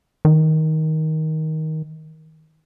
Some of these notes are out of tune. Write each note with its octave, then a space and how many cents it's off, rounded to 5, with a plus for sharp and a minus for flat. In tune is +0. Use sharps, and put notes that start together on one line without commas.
D#3 +15